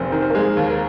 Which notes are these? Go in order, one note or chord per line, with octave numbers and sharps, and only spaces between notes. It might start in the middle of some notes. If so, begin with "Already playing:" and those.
Already playing: F1 A#3 C4 C5
D#3 A#4
C5
G#3 A#3 A#4
D#2
A#4